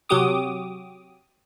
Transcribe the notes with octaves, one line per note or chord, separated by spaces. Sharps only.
C3 F#3 F#4 G4 D6 D#6